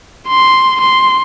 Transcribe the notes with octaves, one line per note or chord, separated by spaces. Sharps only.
C6
C6